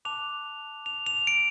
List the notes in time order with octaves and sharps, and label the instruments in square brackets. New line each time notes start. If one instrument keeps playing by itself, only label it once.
[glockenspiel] A5 D6 F#6 F7
F7
F7
D7